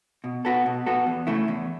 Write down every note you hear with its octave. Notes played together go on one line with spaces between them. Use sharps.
B2
B3 F#4 A4
B2
B3 F#4 A4
E2
C#3 A3 E4
E2